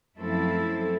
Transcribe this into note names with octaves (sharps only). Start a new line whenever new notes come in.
F#2 F3 A3 C4 E4 A4